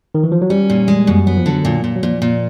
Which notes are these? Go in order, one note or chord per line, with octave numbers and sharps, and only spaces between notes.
D#3
E3
F3
F#3
G3 C#4
A#2
G#3
F#2
F#3 B3
F3
D3 F#3
A#2
A#2
F#3
A#2 F3
A#2